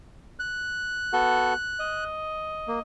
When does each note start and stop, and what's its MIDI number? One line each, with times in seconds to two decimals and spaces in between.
0.40 2.04 90
1.13 1.54 59
1.13 1.54 66
1.13 1.54 69
1.79 2.81 75
2.68 2.79 58